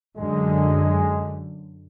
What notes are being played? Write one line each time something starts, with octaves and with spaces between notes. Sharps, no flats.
F#2 D3 G#3